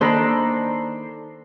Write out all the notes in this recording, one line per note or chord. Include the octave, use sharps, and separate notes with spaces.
D#3 A#3 D4 A4 C5 A#5 B5 C7